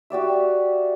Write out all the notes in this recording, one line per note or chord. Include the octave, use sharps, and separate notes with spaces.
F#4 G4 D5 E5